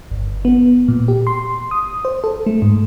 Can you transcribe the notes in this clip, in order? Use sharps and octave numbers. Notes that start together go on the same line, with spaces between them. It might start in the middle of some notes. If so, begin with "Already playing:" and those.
G1
B3
A#2
G4
C6
D#6
C5
A4
A3
G#2